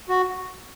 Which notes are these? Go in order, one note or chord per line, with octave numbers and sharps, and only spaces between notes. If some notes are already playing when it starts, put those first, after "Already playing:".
F#4